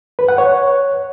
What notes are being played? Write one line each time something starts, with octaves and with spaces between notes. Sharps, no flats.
B4
F#5
C#5